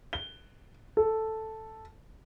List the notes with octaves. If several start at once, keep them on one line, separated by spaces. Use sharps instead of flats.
G7
A4